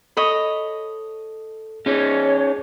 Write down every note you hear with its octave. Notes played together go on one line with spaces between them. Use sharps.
A4 C#5 D#5 B5
C#4 D#4 G#4 C#5